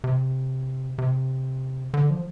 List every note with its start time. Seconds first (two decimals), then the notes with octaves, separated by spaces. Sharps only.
0.04 C3
0.98 C3
1.94 D3
2.10 F3